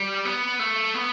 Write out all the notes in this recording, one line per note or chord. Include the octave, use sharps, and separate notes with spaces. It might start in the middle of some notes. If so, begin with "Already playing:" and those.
Already playing: G3
B3
A3
B3